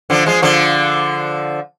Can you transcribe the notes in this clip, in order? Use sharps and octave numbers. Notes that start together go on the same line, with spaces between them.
D3 F3
F3 G#3
D3 F3